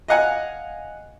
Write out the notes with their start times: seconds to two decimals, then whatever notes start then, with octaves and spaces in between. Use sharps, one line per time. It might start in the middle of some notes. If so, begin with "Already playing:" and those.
0.08 D#5 F5 F#5 G#5